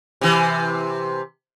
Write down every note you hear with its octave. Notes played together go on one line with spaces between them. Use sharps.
C3 E3